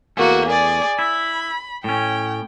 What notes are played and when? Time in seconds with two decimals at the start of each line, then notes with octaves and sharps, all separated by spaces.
0.17 E2 A3 A#3 F#4
0.49 G#4 D5
0.99 E4 B5
1.84 A2 C#4 G5